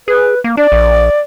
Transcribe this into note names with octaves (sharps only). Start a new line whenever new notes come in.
G#4 B4
A#3
D4 D5
A#1